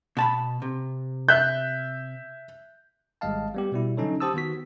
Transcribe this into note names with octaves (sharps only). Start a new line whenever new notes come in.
B2 A5 B5
C3
E5 F#6 G6
G#1 G3 G#3 D#5 F5 A5
G3 B3 G4
B2 G3 E4
D3 F#3 C#4 D#4 A4 C#5
G4 C5 A5 D#6 E6
D#3 B3 F#4 B6